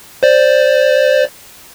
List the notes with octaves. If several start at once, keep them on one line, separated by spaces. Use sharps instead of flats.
C5 D5